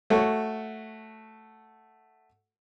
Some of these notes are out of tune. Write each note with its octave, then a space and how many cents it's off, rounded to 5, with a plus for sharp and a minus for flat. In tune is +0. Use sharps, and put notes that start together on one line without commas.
A3 +0 F#4 +0 C#5 +0